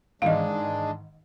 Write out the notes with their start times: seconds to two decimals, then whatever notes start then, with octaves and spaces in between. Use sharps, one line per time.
0.22 G#2 D#3 E3 G#3 D4 D#5 F5